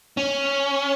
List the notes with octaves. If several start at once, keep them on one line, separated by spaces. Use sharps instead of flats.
C#4